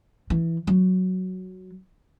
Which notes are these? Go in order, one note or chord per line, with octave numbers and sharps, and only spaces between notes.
E3
F#3